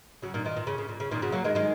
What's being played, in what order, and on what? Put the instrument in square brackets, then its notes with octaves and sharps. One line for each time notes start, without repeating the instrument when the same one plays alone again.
[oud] C#3 F#3
A#2 D#3
A#2 D#3
A#2
C#3
C#3
A#2
C#3
A#2 D#3
C#3 F#3
F#3 A#3
D#3 G#3
D#3 G#3